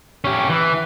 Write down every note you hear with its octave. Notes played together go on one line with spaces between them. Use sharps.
C#4 G4
E3